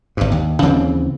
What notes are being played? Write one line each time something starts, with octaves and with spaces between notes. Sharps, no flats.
G#1 G2
D#2
D#2 C#3 E3 C4